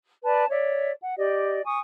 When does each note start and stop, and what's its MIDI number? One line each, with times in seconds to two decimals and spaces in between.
0.24 0.45 71
0.24 0.45 74
0.24 0.45 81
0.49 0.91 73
0.49 0.91 74
0.49 0.91 76
1.01 1.17 78
1.17 1.62 67
1.17 1.62 74
1.17 1.62 75
1.65 1.79 80
1.65 1.79 85
1.65 1.79 87